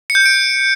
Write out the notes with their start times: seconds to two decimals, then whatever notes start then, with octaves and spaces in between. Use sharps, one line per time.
0.10 C#7
0.15 G6
0.20 C#7
0.26 D7